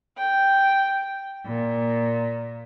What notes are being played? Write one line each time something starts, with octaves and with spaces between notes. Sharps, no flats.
G5
A#2